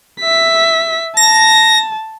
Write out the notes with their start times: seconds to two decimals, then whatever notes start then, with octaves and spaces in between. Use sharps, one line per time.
0.21 E5 B6
1.17 A5 A#6